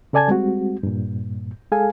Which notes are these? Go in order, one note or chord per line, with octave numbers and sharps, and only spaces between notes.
C#3 A4 D5 G#5 A5 G#6
G3 G#3 C4 F#4
G2 A#2
G#3 G#4 A4 F5 G#5